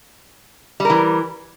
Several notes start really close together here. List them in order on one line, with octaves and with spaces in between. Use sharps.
G3 A#4 E3